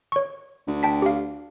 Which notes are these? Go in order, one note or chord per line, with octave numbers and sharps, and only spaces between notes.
C#5 C#6
D2
G5 A5 B6
G4 F5